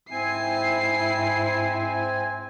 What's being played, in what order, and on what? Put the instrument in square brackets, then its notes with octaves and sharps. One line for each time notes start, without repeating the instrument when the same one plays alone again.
[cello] G#2 E4 [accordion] C4 G#5 [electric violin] C7